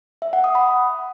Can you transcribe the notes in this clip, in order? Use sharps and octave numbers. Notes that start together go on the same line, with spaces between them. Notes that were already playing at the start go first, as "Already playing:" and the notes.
E5
F#5
D#6
B5